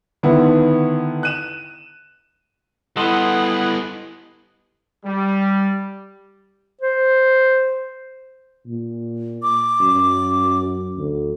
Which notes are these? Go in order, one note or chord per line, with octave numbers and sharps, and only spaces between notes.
D3 D#3 B3 E4
F#6 D#7 E7
G3 B3 E4 A4 D#5 F#5 C6
G3
C5
A#2
D6
F#2
D2